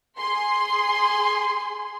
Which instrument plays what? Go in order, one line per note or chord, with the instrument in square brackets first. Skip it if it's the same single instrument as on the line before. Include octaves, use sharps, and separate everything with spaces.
[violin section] G#4 C6